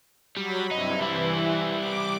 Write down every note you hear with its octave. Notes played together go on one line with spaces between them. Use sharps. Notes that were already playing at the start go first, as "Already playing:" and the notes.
F#3 G3 B5
G2 C3 D#4 E4
E3 G3 E4
D6